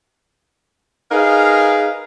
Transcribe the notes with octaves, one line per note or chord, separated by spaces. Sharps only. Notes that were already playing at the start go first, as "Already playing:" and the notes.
D#4 G#4 A#4 B4 F5